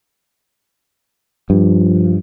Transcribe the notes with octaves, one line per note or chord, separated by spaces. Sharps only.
G2 F3